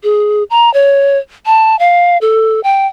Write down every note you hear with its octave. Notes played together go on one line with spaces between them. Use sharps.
G#4
A#5
C#5
A5
F5
A4
G5